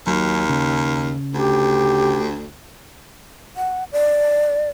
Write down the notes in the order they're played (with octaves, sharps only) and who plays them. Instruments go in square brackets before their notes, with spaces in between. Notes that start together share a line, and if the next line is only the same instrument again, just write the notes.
[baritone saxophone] D#2 [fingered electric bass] F#3
[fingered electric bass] C#3
[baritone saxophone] D2 [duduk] G4
[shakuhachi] F#5
D5